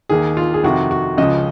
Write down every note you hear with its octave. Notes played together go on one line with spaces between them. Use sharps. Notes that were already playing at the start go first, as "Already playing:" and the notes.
D#2 D#3 G#4
F4
G#4
F2 C3 D#3 F#4
F#4
C#2 C#3 F3 D#5